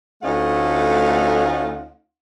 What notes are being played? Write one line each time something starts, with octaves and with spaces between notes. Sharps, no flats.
D2 A3 C#4 D#4 F4 F#5